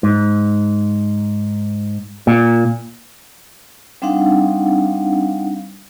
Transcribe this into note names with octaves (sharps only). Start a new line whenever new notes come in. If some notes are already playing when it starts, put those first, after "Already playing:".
G#2
A#2
G3 C4 D4 D#4 F5 F#5